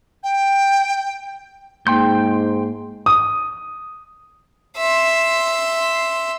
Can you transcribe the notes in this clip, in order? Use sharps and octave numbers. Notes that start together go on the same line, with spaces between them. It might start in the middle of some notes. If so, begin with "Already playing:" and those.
G5
G#2 A#3 G5 C6 G6
D#6
E5 C6